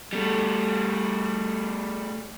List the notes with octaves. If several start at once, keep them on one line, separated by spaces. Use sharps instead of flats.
G3 A3